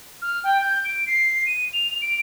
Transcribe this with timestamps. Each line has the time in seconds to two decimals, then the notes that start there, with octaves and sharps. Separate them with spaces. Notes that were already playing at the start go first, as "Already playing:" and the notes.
0.22 F6
0.44 G5
0.61 G6
0.85 D7
1.07 C7
1.46 D#7
1.73 F7
2.02 D7